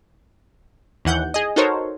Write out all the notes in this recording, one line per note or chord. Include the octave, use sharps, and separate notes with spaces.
D#2 E3 F#5 G6
G#4 D#5
D#4 F#4 A4 A#4 C5 C#5